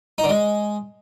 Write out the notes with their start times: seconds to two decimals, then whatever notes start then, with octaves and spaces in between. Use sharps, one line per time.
0.18 D#4
0.24 D3
0.29 G#3